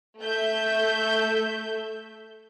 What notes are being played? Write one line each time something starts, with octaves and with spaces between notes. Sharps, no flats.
A3 E5 G6